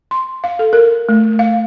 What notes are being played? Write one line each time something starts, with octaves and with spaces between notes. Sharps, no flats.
C6
F5
A4
A#4
A3
F5